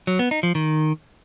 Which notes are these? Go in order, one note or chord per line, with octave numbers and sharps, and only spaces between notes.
F#3
B3
D#4
F3
D#3